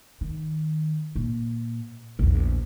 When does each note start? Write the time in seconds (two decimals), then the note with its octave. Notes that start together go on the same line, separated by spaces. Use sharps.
0.21 D#3
1.16 A#2
2.19 A#1 E2